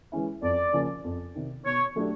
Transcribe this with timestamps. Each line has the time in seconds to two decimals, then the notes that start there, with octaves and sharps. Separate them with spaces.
0.12 E3 G#3 C#4 E4
0.42 F2 D5
0.73 C#3 F3 A#3 C#4
1.04 F2
1.35 C3 D#3
1.65 B2 C#5
1.96 F#3 A3 D4 G4